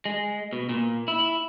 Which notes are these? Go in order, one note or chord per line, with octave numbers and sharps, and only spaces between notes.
G#3
B2
A#2
E4